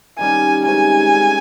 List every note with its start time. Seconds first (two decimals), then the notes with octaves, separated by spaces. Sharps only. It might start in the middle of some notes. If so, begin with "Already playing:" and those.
0.19 D#3 G3 C#4 G#5
0.64 C3 D#3 G#3 C#4 G#5
1.11 G3 C#4 G#4